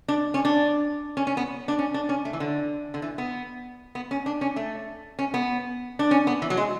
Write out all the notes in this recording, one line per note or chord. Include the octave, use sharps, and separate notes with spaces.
D4
C#4
D4
C#4
C#4
B3
D4
C#4
D4
C#4
A3
E3
D3
D3
E3
B3
B3
C#4
D4
C#4
A3
C#4
B3
D4
C#4
B3
E3
F#3
G#3